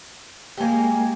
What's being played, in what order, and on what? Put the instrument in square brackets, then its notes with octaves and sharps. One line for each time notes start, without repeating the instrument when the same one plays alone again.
[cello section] G#3 A#3 [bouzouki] G4 G#5